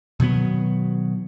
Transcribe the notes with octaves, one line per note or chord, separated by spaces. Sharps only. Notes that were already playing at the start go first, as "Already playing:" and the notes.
B2 D#3 F#3 B3